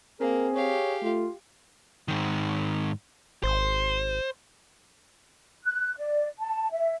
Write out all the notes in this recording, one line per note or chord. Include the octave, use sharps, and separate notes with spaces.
A#3 C4 G#4 A#4
G4 C#5 F5
A3 F4
G#2 D#3
G#1 C5
F#6
D5
A5
E5